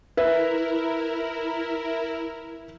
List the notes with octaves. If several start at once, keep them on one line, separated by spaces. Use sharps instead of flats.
E4 A#4 B4 E5